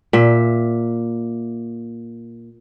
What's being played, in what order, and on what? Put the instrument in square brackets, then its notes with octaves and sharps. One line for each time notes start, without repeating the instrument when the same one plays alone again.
[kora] A#2 E5